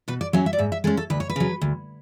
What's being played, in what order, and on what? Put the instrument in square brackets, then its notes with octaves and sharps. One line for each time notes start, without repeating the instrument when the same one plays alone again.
[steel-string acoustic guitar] B2 B4
D5
F#3 C#4 E5
E5
D5
G#2 E5
E5
G#3 C#4 A4
A4
D2 B4
C#5
B4
C#3 F#3
D2